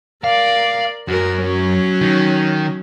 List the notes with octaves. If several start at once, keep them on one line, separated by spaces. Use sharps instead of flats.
A#4 D5 F5
F#2 F#4 A#4
F#3 C#4
D#3